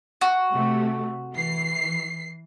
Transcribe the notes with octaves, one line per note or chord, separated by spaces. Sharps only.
F#4
C3 A3
E3 C7